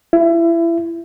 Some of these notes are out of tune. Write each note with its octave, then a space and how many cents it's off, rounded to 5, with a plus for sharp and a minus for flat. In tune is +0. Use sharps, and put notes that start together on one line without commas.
E4 +25